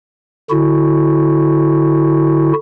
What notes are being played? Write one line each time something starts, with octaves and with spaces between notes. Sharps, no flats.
D3 E4 F#4